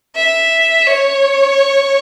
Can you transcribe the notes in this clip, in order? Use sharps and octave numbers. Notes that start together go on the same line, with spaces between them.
E5
C#5